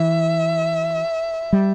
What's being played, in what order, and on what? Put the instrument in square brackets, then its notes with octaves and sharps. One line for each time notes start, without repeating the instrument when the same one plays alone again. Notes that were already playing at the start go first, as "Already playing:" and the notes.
Already playing: [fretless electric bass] E3 [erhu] E5
[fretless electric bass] G3